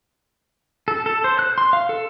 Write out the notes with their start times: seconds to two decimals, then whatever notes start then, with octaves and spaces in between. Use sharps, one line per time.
0.88 A4
1.06 A4
1.24 C5
1.39 F#6
1.58 C6
1.73 F5
1.89 A4